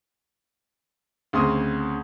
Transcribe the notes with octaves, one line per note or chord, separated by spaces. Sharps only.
D2 C#3 C4 C6 D#6